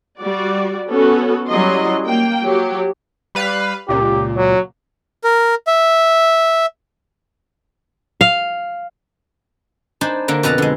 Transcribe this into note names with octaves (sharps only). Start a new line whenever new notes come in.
G3 F#4 D5
B3 C#4 F#4 A4
F#3 G3 C#4 E4 D#5 C6
A#3 G5
F#3 G4
G3 B4 F5
C#2 A#2 G4
F#3
A#4
E5
F5
D4 D#4 C5 G#5 A5 B5
D3 A#3 D4
F2 B2 B4 A5 A#5
D3 G#3